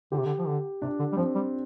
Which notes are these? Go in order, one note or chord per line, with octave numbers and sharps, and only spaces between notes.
D3 G4
C3
D3
F3
D3
C3 D4
D3
G3
F3 C4
G3